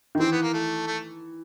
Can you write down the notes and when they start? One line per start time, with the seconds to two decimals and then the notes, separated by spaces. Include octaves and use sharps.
0.15 D#3
0.20 E3 C4
0.32 B3
0.43 A#3
0.54 A3
0.87 A3